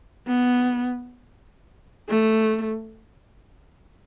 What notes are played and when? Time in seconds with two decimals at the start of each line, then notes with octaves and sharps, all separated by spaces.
0.27 B3
2.09 A3